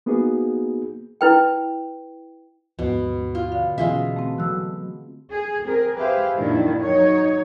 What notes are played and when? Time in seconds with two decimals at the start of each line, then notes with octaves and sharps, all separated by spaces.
0.06 A#3 B3 D#4 F#4 G#4
1.21 E4 B4 G5
2.79 D#2 G#2 B2 F3
3.35 F4
3.52 D3 F5
3.78 B2 E3 G#3 C#4 F4 E5
4.16 A3 C4
4.38 E3 F#3 A3 E6 F#6
5.30 G#4
5.63 C4 G#4 A#4
5.97 G4 G#4 B4 C5 E5 F5
6.35 F#2 A#2 D#3 F3 D4 E4
6.81 F#3 D#4 C#5